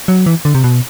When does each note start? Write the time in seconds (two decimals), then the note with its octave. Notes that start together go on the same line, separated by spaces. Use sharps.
0.08 F#3
0.26 E3
0.45 D3
0.55 C3
0.64 B2